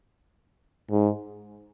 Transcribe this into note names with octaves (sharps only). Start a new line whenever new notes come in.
G#2